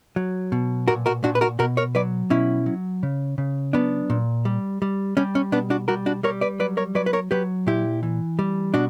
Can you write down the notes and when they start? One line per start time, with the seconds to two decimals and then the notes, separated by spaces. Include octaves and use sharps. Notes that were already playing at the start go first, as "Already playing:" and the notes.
0.16 F#3
0.52 B2
0.88 A#2 F#4 A#4
1.06 F#4 A#4
1.24 A#2 D4 F#4
1.35 B4
1.41 F#4 A#4
1.59 B2 F#4 A#4
1.77 A#4 C#5
1.95 F#3 B4 D5
2.30 B2 C#4 E4
2.66 F#3
3.03 C#3
3.38 C#3
3.73 F#3 B3 D4
4.10 A#2
4.45 G3
4.82 G3
5.17 G3 C#4
5.35 C#4
5.52 B2 B3 D4
5.70 D4 F#4
5.88 G3 F#4 A#4
6.06 D4 F#4
6.23 G3 A#4 C#5
6.41 B4 D5
6.59 F#3 B4 D5
6.77 A#4 C#5
6.95 F#3 B4 D5
7.06 B4
7.13 A#4 C#5
7.31 F#3 G4 B4
7.67 A#2 E4 G4
8.03 E3
8.39 G3
8.74 B2 D4 F#4